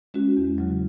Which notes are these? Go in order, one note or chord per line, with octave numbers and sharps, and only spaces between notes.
G#3 C#4 F#4
E2
C#3 F#3